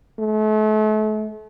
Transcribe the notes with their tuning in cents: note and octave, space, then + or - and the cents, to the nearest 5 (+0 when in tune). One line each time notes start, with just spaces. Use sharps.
A3 -40